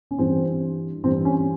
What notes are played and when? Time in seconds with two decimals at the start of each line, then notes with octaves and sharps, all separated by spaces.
0.11 C#4
0.18 G2 E3 C4
1.04 G2 E3 C4
1.25 C#4